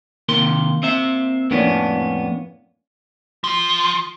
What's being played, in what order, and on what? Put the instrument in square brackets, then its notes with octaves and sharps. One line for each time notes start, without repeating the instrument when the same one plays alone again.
[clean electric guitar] C3 D#3 C6 [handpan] A#3
[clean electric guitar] C4 E5
[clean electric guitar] F2 A2 B3 [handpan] A#3 C#4 D4
[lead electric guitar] F3